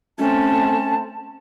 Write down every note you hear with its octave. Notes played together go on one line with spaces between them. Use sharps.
A3 C4 C#4 A5